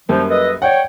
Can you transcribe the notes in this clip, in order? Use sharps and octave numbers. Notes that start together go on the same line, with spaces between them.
F#2 F3 G3 A#3
A4 B4 D#5
C#5 D5 F#5 G5